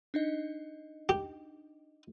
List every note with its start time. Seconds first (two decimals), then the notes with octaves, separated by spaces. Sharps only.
0.14 D4 D#4 D#5
1.09 G4